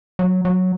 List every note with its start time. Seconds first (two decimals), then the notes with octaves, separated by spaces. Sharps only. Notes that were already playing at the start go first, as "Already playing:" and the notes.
0.19 F#3
0.45 F#3